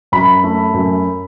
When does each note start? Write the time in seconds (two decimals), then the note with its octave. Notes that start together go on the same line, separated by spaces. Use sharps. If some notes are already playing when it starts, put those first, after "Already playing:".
0.12 F#2 B5
0.44 A3
0.74 F#2